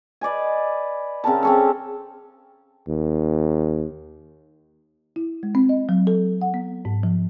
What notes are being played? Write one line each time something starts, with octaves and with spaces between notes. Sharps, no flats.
B4 D5 D#5 G#5
C#3 C4 A#4 A5
C4 C#4 A4
D#2
E4
G#3
C4
D#5
F#3
A4
F#5
B3
G#2
F3